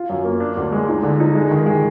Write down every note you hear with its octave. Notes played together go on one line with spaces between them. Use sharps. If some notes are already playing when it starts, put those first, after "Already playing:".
Already playing: F4
F#2
A#3
D4
D2
G#3
D#4
D3
D#4
G#3
D#3
G#3